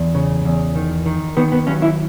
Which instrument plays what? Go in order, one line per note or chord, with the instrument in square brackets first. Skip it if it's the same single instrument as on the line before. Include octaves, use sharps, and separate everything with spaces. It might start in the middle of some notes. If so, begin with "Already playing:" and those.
Already playing: [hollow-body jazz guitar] E2
C#3
E2
D#3
D#3
D#3 B3
B3
F#3 C#4
E4